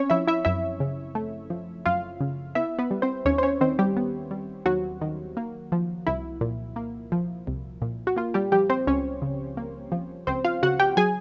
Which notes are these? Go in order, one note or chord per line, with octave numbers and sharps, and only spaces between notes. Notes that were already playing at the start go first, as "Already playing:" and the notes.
Already playing: C4 C#4 C#5
F3 E4 E5
E4 E5
F#2 E4 E5
C#3
A3
F3
F#2 F4 F5
C#3
B3 E4 E5
B3 B4
G3
C4 C5
D#2 C#4 C#5
C5
C#4 C#5
D#3 C4 C5
G3 G4
B3
G3
D#2 F#3 F#4
D#3
A#3
F3
C2 E4
A#2
A#3
F3
C2
A#2
F#4
A#3 F4
G3 G4
F3 G3 G4
C4 C5
C#2 C#4 C#5
C#3
A#3
F3
C#2 C4 C5
F4 F5
C#3 F#4 F#5
G4 G5
F#3 G#4 G#5